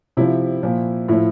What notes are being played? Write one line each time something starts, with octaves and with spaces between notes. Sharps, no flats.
C3 F3 E4
A#2 F3
A2 F3 E4